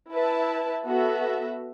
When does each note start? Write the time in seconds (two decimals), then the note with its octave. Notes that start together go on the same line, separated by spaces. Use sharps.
0.10 E4 B4 E5 A5
0.85 B3 F#4 A4 E5